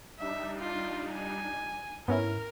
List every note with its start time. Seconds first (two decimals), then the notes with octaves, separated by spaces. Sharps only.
0.19 G3 D4 D#4 E5
0.59 F4
1.12 G#5
2.08 G#2 B3 C#4 E4 A#4 F6